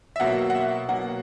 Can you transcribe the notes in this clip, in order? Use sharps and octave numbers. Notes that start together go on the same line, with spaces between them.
E5
B2 F#3 A#3 F#5
F#5
E5
B2 F#3 A#3 F#5